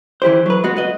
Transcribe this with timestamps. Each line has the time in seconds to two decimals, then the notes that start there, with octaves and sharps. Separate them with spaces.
0.22 E3 E4 G4 C5
0.46 F#3 B4
0.64 G#3 B3 F#4
0.76 F#4 B4 D#5